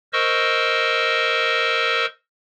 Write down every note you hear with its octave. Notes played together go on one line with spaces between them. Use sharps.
A#4 C5 D#5 C#6 E6